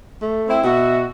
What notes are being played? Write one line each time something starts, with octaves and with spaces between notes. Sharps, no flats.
A3
C4 E4
B2 F#4 E5